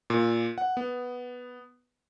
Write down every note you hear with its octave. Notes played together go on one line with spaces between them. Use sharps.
A#2
F#5
B3